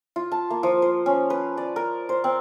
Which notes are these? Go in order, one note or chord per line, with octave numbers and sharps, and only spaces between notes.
F4
A5
A#3
F3
C5
C#4
B4
D5
A#4
C5
C4